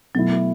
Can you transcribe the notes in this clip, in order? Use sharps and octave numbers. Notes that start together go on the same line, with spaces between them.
B2 F#3 A3 E4